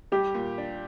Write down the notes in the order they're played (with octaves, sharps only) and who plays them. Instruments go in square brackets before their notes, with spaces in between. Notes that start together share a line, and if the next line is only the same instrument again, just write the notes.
[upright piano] G3 [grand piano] G4
[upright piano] A#2
D4